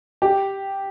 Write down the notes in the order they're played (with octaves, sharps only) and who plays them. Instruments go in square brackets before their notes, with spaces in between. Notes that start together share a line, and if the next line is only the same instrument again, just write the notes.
[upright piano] G4